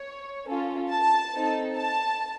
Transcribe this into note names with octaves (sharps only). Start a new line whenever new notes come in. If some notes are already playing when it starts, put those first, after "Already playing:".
Already playing: C#5
C#4 F4 A4
A5
C4 D#4 A4
A5